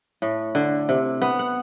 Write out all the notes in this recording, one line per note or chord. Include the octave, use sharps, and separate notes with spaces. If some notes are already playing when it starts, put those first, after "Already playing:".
A2
D3
C3
B3
F#5